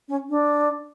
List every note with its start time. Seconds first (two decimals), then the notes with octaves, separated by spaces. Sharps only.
0.09 C#4
0.29 D4